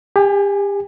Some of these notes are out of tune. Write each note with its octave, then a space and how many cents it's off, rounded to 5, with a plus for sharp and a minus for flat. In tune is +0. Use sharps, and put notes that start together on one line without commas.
G4 +35 G#5 +0